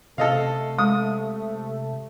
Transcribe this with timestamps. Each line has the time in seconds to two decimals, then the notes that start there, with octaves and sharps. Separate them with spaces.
0.18 C3 A3 A4 D#5 F5
0.79 G#3 D#6